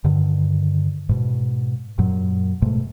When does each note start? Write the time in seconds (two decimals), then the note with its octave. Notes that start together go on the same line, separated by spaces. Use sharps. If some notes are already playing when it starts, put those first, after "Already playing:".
0.04 G2 D3 D#3
1.09 G#2 B2
1.98 F#2 A#2 F#3
2.62 G#2 B2 A3